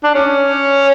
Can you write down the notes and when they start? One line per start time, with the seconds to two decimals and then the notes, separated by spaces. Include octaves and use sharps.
0.03 D4
0.15 C#4